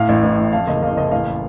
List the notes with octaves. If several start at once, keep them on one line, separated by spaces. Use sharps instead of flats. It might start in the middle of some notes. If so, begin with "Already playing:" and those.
Already playing: A2 F5
A1
A1
A2
F2 F5
F#1 D#5
F#1 F5
F#1 D#5
A1 F5